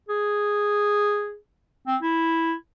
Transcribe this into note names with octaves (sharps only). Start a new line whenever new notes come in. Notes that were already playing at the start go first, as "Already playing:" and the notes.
G#4
C4
E4